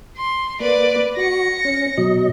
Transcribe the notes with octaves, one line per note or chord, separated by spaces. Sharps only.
C6
A#3 B4 D5
F#4 A#6 C#7
C#4
B2 F#3 D#5